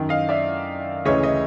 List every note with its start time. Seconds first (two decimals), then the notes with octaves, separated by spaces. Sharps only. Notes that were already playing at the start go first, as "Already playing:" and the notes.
Already playing: F#2 D#3
0.09 D#5 F5
0.29 D5 E5
1.05 D2 C#3 E3 C#5 D#5
1.23 D#5